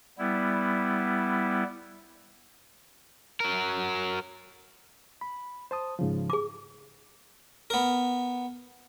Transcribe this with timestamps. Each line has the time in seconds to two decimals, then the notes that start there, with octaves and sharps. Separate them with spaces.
0.18 G3 B3 E4
3.40 F#3 A#4
5.21 B5
5.71 C5 A5 D#6
5.99 G#2 C#3 F3
6.30 G#4 D6
7.70 B3 A#4